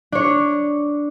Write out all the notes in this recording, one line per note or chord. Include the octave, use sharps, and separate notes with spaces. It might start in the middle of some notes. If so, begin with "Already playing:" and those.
D4 C#5